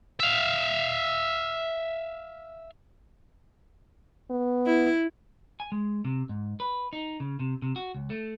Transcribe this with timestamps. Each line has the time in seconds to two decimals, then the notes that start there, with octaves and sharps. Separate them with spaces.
0.20 E5 F5
4.30 B3
4.67 E4
5.60 G#5
5.72 G#3
6.05 C3
6.29 G#2
6.60 B4
6.93 D#4
7.20 C#3
7.40 C3
7.62 C3
7.76 F#4
7.95 C#2
8.10 A3